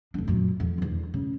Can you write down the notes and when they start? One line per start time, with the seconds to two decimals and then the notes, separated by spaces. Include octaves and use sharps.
0.14 F1 D4
0.28 F#2 A#2
0.60 F2
0.78 E2 D3
1.14 C#3